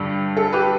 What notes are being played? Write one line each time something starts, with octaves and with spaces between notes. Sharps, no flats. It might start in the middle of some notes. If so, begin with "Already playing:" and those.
Already playing: G2 D3 G3 G4
A4
G4 B4